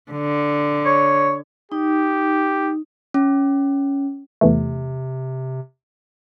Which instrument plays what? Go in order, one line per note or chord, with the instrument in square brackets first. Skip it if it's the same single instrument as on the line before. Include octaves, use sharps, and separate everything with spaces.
[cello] D3
[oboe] C#5
[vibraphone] D#4 [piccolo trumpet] G4
[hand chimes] C#4
[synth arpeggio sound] E2 E3 A3 [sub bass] C3